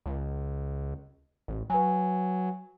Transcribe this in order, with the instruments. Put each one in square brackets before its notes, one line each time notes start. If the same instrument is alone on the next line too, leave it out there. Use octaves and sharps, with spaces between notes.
[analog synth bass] C#2
A1
[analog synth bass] F#3 [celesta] B4 G#5